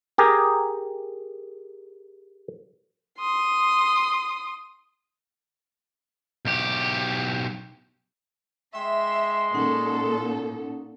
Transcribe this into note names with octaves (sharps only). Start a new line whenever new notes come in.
G4 G#4 A#4
C6 D#6
B1 G4
G#3 E5 G5 C6
A#2 C#4 D#4 A4 F#5